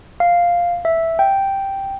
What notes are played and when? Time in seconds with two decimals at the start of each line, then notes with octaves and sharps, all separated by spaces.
0.20 F5
0.85 E5
1.19 G5